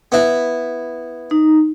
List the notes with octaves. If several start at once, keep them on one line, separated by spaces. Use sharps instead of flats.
B3 E4
D#4